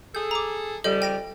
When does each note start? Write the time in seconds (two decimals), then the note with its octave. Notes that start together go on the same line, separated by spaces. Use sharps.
0.15 G#4 A4 G6
0.31 A#5 D6
0.84 C#3 F3 G3 A4 D#5 G6
1.02 G5 A#6 D7